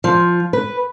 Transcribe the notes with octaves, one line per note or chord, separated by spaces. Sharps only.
F3
B4